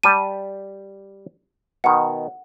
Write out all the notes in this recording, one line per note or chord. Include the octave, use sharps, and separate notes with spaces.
G3 G4 A5 D#7
B2 D#3 F#5